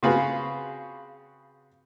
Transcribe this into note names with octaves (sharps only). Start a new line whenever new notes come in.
C#3 C4 F4 F#4 G#4 B4